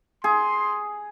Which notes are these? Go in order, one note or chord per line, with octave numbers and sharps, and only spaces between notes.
G#4 C6